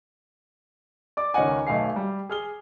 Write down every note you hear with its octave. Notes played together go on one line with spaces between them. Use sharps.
D5 D6
C#2 D#3 C#4 D#5 F#5 G#5
B1 A3 E5 F5 G#5 C7
G3
G#4 F6 G7